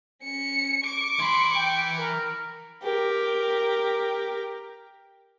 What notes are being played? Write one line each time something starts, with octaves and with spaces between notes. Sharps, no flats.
C#4 C#7
C#6 D6
E3 B5 C6
G5
A#4
G4 A#4